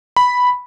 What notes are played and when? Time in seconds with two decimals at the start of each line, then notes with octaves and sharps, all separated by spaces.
0.17 B5